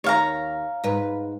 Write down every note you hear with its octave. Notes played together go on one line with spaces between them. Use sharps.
D#2 C#5 F5 A#5
G#2 B4